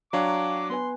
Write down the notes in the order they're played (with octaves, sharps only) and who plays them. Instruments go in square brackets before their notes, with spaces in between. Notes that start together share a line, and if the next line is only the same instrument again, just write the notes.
[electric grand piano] F#3 D4 C#5 [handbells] F5 G5 A#5 [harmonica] D6
[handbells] B3 B4 G#5 [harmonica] C6